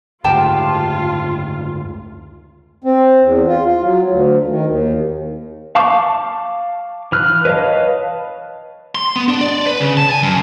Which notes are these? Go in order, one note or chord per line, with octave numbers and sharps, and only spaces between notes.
F#1 D2 G#2 F4 G4 G5 A5
C4
E2
F4
F4
F#3
D2
D#3
D#2
F5 A5 C#6 D6
E3 F6 F#6
B4 C#5 D#5 F5 A5
C6
B3
D4
D5
B4
C#3
A5
G#5
F#2